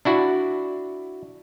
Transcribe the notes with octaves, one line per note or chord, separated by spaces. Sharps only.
D4 E4 F#4